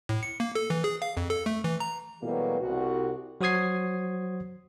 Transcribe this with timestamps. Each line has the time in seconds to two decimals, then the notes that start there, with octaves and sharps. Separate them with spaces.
0.09 A2
0.23 C#7
0.40 A#3
0.55 A4
0.70 E3
0.84 G#4
1.02 F5
1.17 F2
1.30 A4
1.46 A3
1.64 E3
1.80 A#5
2.23 B2 E3 F#3 G3 A3 A#3
2.61 C2 F#4
3.41 F#3 F#4 C5 D#6 G#6 C7